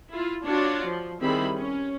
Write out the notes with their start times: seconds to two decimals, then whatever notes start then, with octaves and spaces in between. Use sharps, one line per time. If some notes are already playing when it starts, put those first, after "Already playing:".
0.10 E4 F4
0.44 D4 F4 F#4 C#5 D5
0.85 F3
1.21 D#3 G3 C4 E4 G#4 B5
1.55 C#4